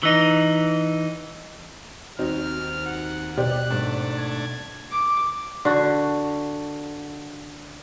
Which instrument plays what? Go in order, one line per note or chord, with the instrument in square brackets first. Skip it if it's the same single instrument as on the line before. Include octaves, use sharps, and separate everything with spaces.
[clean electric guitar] E3 D#4
[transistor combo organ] D#2 [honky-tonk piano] C4 D#4 F#4 [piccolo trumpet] F6
[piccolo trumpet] F#5
[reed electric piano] B2 [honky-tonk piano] G4 C5 D5 [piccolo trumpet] F#6
[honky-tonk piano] G#1 [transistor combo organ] A3 D4
[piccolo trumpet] G#6
[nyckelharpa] D6
[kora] D3 F#4